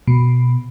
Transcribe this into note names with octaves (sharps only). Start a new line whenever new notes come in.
B2